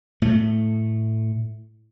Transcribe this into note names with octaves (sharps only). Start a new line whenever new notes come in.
A2 A3